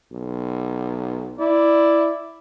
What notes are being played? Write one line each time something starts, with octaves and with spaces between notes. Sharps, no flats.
B1
E4 D5